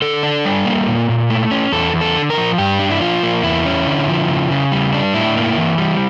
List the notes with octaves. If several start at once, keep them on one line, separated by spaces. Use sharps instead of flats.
D3 A4
D4
G3
A#3
A#2
A#2
A3
C#4
E2 A4
E2
A4
D3
A#4
F3
G2 G4
D4
E4
F3 F4
A#3
E2 E4
C#4
D3
F3
C#3
C#3
G3
D4
A2 E4
A#3
E3
G3